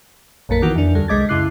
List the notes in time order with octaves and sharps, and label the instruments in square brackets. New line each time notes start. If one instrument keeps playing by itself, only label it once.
[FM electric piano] A#1 F#2 A#3 A#4 B6
D#3 E3 B3 F#4 A#4
F2 D4
D#2 D3 G3 A4
C2 G#3 D#5 D6 G#6 A6
F#2 C#3 E4 D6 F#6 C7